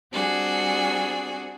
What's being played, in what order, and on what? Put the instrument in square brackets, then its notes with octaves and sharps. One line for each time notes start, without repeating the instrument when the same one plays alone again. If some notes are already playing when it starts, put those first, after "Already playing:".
[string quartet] G3 C4 D4 F#4 G#4